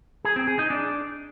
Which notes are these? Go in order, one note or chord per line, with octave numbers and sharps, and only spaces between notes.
G#4
C4
G#4
D#4
D4